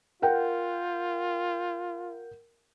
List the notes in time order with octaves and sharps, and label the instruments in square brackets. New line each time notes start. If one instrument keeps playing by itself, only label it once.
[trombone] F4 [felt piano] A#4 F#5 G5